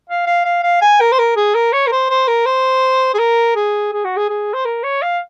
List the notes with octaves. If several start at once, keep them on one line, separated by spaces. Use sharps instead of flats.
F5
F5
F5
F5
G#5
A#4
C5
A#4
G#4
A#4
C#5
A#4
C5
C5
A#4
C5
G#4
A#4
G#4
G#4
F#4
G#4
G#4
C5
A#4
C#5
F5